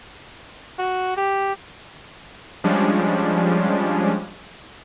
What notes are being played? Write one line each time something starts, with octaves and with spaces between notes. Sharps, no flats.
F#4
G4
F3 G3 G#3 C#4 D4